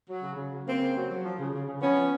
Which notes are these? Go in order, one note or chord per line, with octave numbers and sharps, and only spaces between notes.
F#3
C#3
C#3
F#3
C#3 A#3 C4
C#3
F#3
F#3
F3
C#3
C#3
C#3
F3 B3 C#4
F3